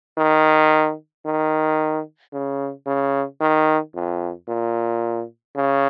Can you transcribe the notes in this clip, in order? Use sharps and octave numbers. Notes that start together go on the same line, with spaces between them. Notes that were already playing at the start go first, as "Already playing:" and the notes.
D#3
D#3
C#3
C#3
D#3
F2
A#2
C#3